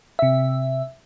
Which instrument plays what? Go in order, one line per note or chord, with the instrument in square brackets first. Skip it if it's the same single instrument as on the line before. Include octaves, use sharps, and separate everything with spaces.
[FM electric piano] C3 E5